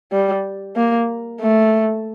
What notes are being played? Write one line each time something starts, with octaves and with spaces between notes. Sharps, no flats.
G3
A#3
A3